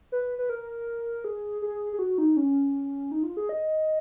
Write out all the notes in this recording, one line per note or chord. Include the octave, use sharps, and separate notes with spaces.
B4
B4
A#4
G#4
G#4
G#4
F#4
D#4
C#4
D#4
F4
G#4
D#5